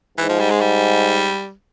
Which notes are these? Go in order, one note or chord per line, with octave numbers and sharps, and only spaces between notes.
G#2 E3
F3
G3
G#3
G3